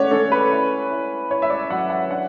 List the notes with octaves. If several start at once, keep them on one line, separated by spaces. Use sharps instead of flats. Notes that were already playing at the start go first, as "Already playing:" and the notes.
Already playing: A3 C#4 E4 C#5 D5 F#5
C#4 A4
B4
E4
E4
E4 C#5
E5
D5
F#3 F#5
F#5
D4 F#5